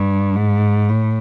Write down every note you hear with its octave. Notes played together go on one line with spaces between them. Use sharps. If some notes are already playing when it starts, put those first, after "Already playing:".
Already playing: G2
G#2
A2